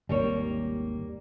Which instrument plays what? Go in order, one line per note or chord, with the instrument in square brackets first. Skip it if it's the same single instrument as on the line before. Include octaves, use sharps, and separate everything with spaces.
[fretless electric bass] G#1 D#2 [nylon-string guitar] G3 A#3 C#5